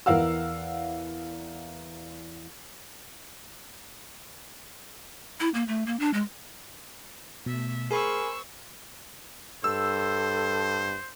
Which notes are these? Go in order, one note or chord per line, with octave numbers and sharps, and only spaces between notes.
E2 E3 A#4 F5 F#5 E6
E4
A#3
A3
A#3
D4
G#3
B2 A3 E5
G#4 A#4 C5 G#5 B5 C#6 E6
G2 A4 C5 E6